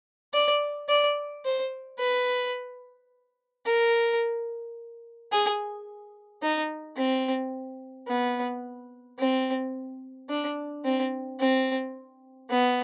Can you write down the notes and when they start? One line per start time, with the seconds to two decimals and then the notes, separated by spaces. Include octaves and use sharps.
0.34 D5
0.89 D5
1.45 C5
1.99 B4
3.66 A#4
5.32 G#4
6.43 D#4
6.97 C4
8.08 B3
9.19 C4
10.29 D4
10.85 C4
11.40 C4
12.50 B3